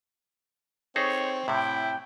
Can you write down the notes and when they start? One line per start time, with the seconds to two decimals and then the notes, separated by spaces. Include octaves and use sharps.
0.96 C4 D#4 G#4 A4 C#5
1.48 A2 C3 E4 G5